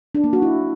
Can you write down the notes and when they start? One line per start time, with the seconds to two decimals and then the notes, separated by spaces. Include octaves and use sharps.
0.15 D4
0.24 A#3
0.33 F#4
0.42 E4